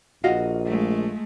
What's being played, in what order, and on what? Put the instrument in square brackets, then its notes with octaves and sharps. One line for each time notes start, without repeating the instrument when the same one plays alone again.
[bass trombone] A#1 [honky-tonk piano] F4 [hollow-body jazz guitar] F#4 D#5 F5
[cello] G#3 A3